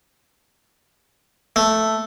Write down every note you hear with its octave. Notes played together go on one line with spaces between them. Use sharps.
A3